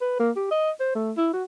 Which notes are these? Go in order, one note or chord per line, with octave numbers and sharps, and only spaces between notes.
B4
A#3
G4
D#5
C5
A3
E4
F#4